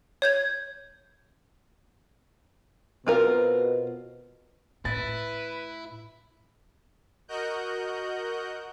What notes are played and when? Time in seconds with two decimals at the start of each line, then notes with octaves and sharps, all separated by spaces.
0.22 C#5 G6 G#6
3.07 B2 C4 F4 A#4
4.85 A2 E4 B4 A6
7.28 F#4 A#4 D#5 F#6 G6